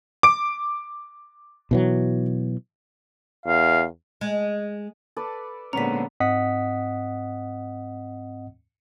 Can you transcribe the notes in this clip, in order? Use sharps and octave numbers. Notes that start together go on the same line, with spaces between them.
D6 D7
B2 E3 F#3
E2 F5
G#3
A4 B4 D5
A#2 D3 G#3 B3 C#4 A#5 B6
G#2 C4 D#5 F#5 D#6 B6